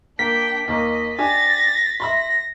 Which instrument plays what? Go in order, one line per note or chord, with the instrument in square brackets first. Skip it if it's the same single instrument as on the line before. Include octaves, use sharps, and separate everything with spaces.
[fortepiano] A#3 [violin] D4 G5 [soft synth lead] B6
[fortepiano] D#2 A#3 [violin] D#5
[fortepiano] D4 G4 G#5 [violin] A6 A#6
[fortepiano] E5 B5 C6 [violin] A#6